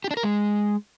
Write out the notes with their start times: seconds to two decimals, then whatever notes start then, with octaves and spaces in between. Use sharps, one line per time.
0.04 G4
0.11 D4
0.17 A#4
0.23 G#3